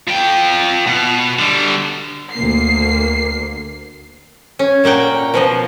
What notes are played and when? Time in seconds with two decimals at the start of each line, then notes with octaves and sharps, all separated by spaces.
0.08 F3 G5
0.87 B2
1.39 D3 G3
2.33 D2 A#3 C7
4.59 C#4
4.84 A#2 A#3 F#5 G5
5.34 B2 F3 D#5